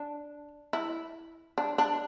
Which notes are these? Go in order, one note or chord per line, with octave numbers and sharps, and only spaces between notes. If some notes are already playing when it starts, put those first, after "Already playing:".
Already playing: D4
E4
D4
D4